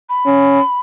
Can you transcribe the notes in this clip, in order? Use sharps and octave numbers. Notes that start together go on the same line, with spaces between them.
B5
C#4